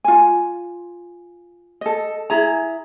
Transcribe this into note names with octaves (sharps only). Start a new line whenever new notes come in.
F4 G#5
A4 D#5
E4 G#4 A#5